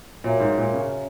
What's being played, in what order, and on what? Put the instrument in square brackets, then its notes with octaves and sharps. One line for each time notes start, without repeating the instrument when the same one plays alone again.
[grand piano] A#2 [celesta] F#4 C#5 E5 A#5
[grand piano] G#2
A#2
C#3